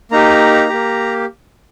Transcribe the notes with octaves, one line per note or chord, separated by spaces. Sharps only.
A#3 D#4 G4 A#5
A#3 G4